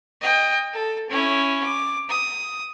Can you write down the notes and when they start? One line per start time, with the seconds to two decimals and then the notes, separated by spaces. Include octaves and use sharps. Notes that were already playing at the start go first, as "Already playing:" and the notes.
0.21 D#5 G5
0.73 A4
1.09 C#4 E4
1.63 D6
2.09 D#6